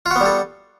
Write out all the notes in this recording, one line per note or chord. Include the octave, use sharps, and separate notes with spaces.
G3 B3 F4 F#4 A4